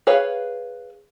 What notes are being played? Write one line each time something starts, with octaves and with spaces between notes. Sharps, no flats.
G#4 B4 C#5 F5